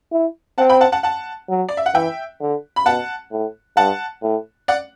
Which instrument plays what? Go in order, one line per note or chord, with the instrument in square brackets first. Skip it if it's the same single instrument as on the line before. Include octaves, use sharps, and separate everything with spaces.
[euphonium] E4
[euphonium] C4 [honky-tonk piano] F#5 A5
[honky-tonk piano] G5 B5
F#5 A5
F#5 A5
F#5 A5
[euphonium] F#3
[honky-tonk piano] D5
E5
F#5
[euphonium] E3 [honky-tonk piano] E5 G5
[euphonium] D3
[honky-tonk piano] B5
[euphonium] B2 [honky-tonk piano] F#5 A5
[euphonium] A2
[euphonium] G2 [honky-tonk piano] F#5 A5
[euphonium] A2
[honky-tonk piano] D5 F#5